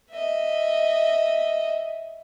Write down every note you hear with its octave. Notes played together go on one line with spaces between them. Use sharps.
D#5 E5